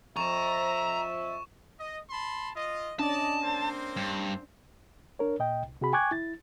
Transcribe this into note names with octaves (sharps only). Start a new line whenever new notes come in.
F2 E5 A#5 C#6 E7
D#5
A5 B5 C6
F4 D#5
C#4 D4 D5 D#5 A5
A#3 C4 C5
G2
D4 A#4 C#5
A#2 D#5 G5
C2
C3 F#4 G#4 B5
G5 G#5 C#6 D6 F#6 G#6
E4 A6